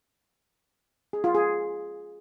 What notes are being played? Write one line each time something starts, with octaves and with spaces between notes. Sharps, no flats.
G#4
F4
G#4